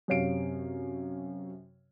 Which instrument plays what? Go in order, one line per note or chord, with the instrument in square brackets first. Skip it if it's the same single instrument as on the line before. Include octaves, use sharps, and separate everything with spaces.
[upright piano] F#2 C3 C#5 F5 C7 D7